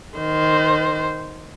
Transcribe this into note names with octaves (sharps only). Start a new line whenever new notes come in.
D#3 C5